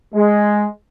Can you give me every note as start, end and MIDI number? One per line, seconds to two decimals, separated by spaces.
0.14 0.64 56